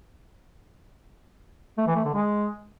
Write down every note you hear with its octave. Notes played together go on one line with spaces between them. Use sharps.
A3
E3
A3
D3
G#3